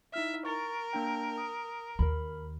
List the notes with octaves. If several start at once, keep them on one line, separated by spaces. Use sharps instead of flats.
D#4 E4 E5 F6
A#4 C#6 A6
A#3 D4 G5
D#6
D#2 A#4 B5